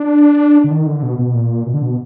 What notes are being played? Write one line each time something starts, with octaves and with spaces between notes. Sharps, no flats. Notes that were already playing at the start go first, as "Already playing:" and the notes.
Already playing: D4
D3
D#3
D3
B2
B2
A#2
B2
D3
B2